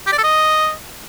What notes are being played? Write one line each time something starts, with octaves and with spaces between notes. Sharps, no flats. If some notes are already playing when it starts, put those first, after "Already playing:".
G4
D5
A4
D#5